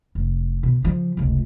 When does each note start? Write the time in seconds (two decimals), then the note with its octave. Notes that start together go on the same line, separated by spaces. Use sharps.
0.15 F1
0.63 B2
0.83 C#3 F3
1.17 F1 C#2